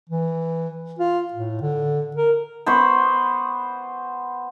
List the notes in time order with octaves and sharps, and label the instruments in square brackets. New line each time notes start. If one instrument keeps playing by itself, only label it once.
[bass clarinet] E3
F4
A2
D3
A#4
[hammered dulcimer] B3 C5 B5 C#6